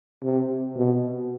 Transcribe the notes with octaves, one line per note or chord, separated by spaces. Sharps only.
C3
B2